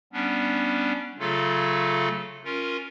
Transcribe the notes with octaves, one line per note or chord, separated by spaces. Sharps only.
G3 B3 C#4 D4
C#3 F#3 A3 F4 A4
C#4 F4 A#4